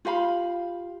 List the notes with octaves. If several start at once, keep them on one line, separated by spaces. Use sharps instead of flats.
F4 G4 F5 B5